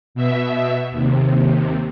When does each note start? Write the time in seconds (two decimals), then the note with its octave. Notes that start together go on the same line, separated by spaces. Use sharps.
0.15 B2 E5
0.92 D#2 C3